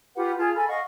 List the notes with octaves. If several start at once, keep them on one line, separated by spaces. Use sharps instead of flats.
F4 G4 B4 F#5
F4 G#4 A5
A4 G#5 B5
D#5 F5 F#5 C#6